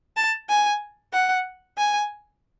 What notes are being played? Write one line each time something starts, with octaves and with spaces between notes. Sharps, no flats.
A5
G#5
F#5
G#5